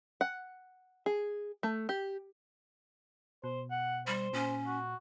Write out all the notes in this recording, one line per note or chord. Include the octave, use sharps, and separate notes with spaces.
F#5
G#4
A3
G4
B2 C5
F#5
G3 C5
A#2 C#4
F#4